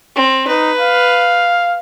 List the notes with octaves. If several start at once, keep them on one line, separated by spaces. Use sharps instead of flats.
C4
D#4 B4
F5